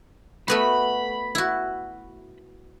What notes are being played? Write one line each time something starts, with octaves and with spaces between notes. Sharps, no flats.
A3 B3 F#4 B5
E4 F#4